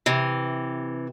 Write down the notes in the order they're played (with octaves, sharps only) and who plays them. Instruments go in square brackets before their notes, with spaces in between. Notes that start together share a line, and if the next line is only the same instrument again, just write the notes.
[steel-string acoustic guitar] C3 E3